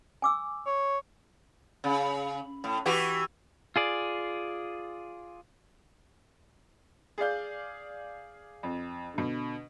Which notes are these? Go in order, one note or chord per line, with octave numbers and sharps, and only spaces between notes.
G#5 D6 E6
C#5
C#3
A2
E3 F#4 G4
F4 G#4 D5
G#4 D5 F5 G6
F2
B2 D3